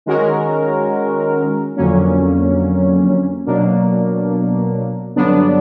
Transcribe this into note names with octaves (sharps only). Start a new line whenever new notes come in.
D#3 G#3 C#4 F#4 A#4
F2 D3 F#3 A#3 C#4
B2 F#3 A#3 D4
G2 D3 F#3 B3 D4